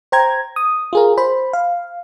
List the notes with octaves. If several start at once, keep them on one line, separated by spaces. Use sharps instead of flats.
C5 G5 A#5 G#6
D#6
F4 G#4 A#4
C5 B5
F5